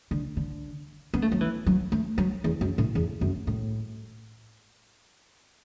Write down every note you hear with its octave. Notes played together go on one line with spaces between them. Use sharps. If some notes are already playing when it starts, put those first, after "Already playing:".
D3
D3
B3
A3
F#3
E3
F#3
A3
F#3
E2
F#2
A2
E2
F#2
A2